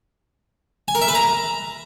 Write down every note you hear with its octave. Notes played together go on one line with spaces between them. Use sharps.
G#5
A#4
E5
B4
A#5